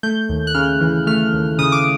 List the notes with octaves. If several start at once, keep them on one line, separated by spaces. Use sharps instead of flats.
A3 G6
D#2
F#6
C#3 F6
E3
A3 F6
D#2
C#3 D#6
D6